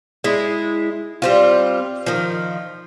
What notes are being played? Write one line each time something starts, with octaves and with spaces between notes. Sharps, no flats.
G#3 E4
G3 C4 F4
D#3 F3